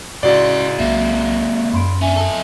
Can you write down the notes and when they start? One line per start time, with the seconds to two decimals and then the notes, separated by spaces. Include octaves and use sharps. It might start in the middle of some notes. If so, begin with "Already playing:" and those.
0.23 C#2 A2 C#4 F#4 D5 C6
0.79 B1 G#3 A#3 E5
1.73 F#2 B5 C6 D7
2.02 C#4 D4 E5 G#5
2.16 A4 D#5